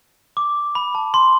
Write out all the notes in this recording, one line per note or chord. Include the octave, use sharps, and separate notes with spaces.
D6
B5
A5
C6